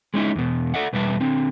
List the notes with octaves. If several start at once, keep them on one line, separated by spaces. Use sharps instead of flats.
G#3 C#4 D#4 E4
E2 B2
A4 D5 E5 F#5
E2 B2 G3 B4 E5 A5
D3 C4